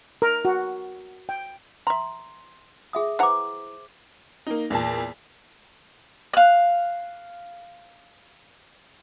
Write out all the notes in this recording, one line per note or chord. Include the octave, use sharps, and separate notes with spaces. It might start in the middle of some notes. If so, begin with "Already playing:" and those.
A#4
F#4
G5
E5 A#5 C6
G#4 E5 D#6
E3 C5 F#5 A#5 D6
A#3 D#4
E2 A#2 A5
F5 F#6